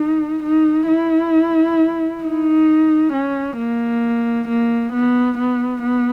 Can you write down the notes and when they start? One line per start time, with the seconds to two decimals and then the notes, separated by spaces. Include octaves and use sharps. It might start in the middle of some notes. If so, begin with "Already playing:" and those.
Already playing: D#4
0.43 D#4
0.89 E4
2.24 D#4
3.13 C#4
3.58 A#3
4.48 A#3
4.93 B3
5.38 B3
5.82 B3